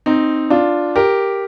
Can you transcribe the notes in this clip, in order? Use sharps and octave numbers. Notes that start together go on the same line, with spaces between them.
C4 D#4
D4 F4
G4 A#4